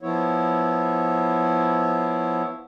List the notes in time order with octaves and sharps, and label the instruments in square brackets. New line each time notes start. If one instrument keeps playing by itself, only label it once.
[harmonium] F3 B3 E4 C#5